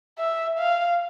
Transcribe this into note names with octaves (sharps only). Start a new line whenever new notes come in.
E5
F5